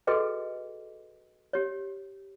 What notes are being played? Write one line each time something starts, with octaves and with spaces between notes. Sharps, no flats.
F#4 G#4 A4 B4 D#5 G5
G4 C#5